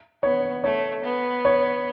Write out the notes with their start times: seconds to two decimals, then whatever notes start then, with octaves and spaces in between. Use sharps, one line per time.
0.23 B3 C#5
0.64 A3 C#5
1.04 B3
1.45 C#5